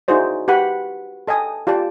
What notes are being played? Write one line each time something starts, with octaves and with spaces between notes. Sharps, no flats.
D#4 E4 F#4 G#4 C5 D5
G4 B4 F#5 B5
A4 D#5 G5 G#5 D#6
F4 G4 D5 A5